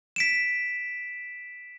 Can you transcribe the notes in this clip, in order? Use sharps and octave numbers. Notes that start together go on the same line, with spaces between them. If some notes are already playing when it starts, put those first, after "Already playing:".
B6 D7 E7